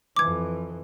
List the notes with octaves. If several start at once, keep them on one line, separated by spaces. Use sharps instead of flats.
F2 E3 D6 G#6